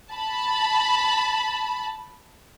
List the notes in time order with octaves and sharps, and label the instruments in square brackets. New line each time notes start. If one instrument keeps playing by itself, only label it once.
[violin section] A5 B5